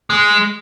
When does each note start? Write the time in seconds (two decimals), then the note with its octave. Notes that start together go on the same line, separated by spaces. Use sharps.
0.10 G#3